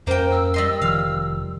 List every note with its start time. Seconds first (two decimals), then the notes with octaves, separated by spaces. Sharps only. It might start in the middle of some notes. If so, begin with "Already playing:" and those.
0.07 F2 A#3 C#4 C5 G5
0.31 E6
0.54 G3 D#5 C6
0.82 F1 D#3 F3 F5